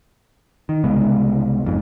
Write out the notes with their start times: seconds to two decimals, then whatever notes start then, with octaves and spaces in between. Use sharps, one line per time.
0.69 D#3
0.84 C2 C#3 G#3 B3
1.65 F#1 F2 G#2